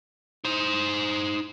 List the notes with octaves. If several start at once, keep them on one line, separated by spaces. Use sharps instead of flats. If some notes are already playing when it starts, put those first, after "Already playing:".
D#4 C5